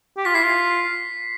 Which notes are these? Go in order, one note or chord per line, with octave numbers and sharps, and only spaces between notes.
G4
F4 B6
E4 C7
F4